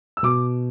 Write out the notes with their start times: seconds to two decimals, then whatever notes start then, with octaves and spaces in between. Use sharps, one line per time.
0.17 E6
0.23 B2 D6